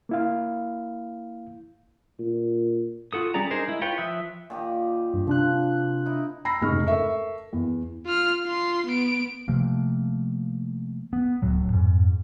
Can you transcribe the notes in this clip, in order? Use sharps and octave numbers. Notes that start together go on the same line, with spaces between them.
A#3 E4 F5
A#2
F4 F#4 A4 D#6
G3 C#4 G#4 D5 A#5
D4 D#4 G#4 A#4 C5
G#3 E4
F4 B4 C#5 G5
F3 E5 D#6 E6 F#6
A#2 D#3 G4
G2
C3 F3 D4 F#6
D#4 E4
A#5 B5 E6 A#6 C7
F1 G#2 C#3 G#4 C#6 F6
A4 A#4 E5 C#6
E2
F4 F6
F4 C6
B3 D7
C3 F3 A3 A#3
B3
D1 C#2 A2 F#3
F2 G#2